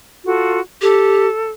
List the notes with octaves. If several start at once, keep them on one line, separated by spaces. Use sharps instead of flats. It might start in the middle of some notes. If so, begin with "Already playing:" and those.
F4 F#4 A4
G4 A4